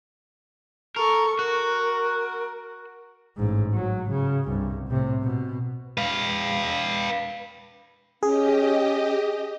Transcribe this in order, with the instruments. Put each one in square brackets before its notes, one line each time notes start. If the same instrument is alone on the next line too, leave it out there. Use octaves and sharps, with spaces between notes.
[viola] A4 C#6 [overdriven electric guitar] A#4
[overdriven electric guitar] F#4 [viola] A#4
[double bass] A1 G#2
F#3
C#3
C2 G2
A2 C3
B2
[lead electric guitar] B4 F5
[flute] C#4 [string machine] G4 D#5 [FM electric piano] G#4